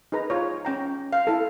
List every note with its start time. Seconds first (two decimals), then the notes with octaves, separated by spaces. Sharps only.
0.12 D#4 G#4 B4 A#5
0.30 F4 C#5
0.65 C#4 G5 A#5
1.13 F5
1.27 E4 A4